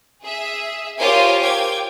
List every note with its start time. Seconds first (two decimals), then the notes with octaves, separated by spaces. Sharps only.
0.24 G#4 E5
1.00 F4 G4 A#4 C5 C#5 G#5
1.43 G5 D6 G#6